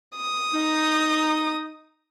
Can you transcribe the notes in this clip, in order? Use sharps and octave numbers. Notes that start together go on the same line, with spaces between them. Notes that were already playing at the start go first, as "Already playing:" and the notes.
D#6
D#4